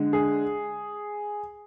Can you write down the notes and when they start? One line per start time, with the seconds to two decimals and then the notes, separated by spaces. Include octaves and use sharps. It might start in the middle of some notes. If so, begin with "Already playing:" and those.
Already playing: D3 G#3
0.13 G#4